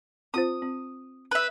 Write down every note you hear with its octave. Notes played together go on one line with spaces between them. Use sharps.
C4 F4 C5 D#6
C4
B4 E5